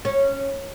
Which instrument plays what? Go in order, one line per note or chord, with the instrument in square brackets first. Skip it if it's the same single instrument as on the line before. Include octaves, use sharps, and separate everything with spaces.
[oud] C#4